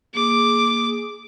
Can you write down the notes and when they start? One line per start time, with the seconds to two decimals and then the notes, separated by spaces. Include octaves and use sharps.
0.15 A#3 G#4 D6